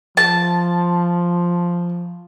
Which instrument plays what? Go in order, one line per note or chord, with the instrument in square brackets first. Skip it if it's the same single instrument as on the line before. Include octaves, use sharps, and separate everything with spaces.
[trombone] F3 [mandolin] A5